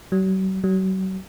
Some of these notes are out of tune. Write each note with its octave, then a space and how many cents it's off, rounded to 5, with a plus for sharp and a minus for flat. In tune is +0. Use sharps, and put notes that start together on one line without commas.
F#3 +45
F#3 +40